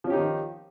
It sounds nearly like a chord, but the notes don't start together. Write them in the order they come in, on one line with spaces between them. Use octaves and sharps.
F3 C#4 G4 D#4 D#3